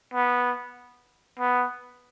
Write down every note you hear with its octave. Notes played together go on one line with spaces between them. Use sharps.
B3
B3